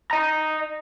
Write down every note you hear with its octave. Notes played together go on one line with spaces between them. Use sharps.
D#5 A#5